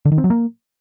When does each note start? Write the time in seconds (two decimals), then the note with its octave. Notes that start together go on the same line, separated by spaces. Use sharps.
0.05 D3
0.12 D#3
0.18 C4
0.24 F#3
0.30 A#3